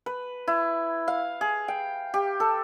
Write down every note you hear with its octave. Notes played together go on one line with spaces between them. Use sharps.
B4
E4
F5
G#4
G5
G4
A4